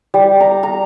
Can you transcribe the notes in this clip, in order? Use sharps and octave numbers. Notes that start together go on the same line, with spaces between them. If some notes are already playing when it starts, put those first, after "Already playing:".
G3
A#5
A#5